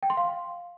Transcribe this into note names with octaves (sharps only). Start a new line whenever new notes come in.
G5
C6
F5